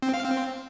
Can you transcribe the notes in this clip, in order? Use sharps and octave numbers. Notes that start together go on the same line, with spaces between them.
C4
F5
C4